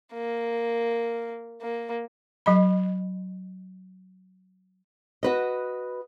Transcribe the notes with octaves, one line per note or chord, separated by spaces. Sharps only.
A#3
A#3
F#3 D#5 B5
F#4 B4 D#5